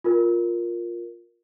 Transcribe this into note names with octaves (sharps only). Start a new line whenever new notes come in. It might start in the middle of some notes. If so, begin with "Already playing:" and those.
F4 A#4